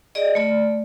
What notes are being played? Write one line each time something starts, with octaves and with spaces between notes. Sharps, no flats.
G#4 D5 D#5
A3 D5